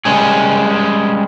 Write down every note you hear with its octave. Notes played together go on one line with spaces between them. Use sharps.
G3 G#3 C#4 G#4